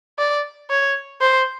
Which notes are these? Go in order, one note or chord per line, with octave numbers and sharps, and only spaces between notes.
D5
C#5
C5